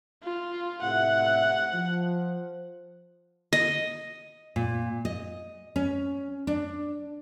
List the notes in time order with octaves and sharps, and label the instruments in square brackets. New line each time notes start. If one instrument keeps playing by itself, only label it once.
[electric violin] F4
[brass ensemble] A2 C3 E5 [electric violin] F#5
[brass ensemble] F3
[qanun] D#5
[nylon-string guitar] A#2
D#5
C#4
D4